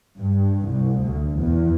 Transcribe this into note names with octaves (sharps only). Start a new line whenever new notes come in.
G2
C2
D2
E2